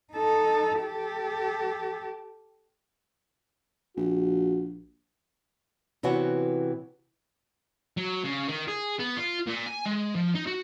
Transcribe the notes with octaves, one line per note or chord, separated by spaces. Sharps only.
D#4 A4
G4 A4
A#1 F#4
C3 E3 B3 C#4 F#4
F#3
C#3
D#3
G#4
B3
F4
A#2
G#5
G#3
F3
D#4
F#4